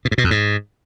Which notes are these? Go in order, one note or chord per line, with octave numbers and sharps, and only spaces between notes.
B2
G#2
B2
F2
G#2